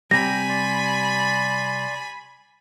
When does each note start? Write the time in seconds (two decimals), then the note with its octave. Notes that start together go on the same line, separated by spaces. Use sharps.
0.11 C3 G3 G5 G#5 A#5 B5 A#6
0.49 D5 C6